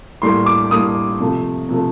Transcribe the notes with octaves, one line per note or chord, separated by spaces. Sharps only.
A2 G3 A#3 C6
D6
A2 G3 A#3 D#6
C3 F3 A3
C3 F3 A3